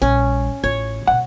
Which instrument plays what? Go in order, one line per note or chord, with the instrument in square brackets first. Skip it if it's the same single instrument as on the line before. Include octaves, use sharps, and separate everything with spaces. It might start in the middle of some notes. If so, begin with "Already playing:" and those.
[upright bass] A#1 G3 [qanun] C#4
[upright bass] A1 F4 [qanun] C#5
[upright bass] B2 G3 [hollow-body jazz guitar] F#5